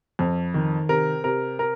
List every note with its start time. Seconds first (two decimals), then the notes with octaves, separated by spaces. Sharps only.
0.19 F2
0.54 D#3
0.89 C3 A#4
1.24 C3 A#4
1.59 A#4